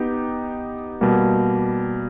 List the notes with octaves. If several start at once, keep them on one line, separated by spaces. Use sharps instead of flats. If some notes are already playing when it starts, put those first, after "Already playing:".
Already playing: B3 D#4 G4
B2 G3 A#3